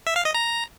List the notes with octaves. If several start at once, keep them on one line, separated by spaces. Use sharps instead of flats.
E5
F5
D#5
A#5